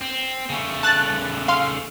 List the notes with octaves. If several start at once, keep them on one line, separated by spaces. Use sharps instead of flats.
C4
C#3 A3
A5 F#6 A6
F5 C6